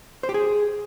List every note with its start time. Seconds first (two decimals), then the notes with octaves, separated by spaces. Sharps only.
0.23 C5
0.29 G4
0.34 G#4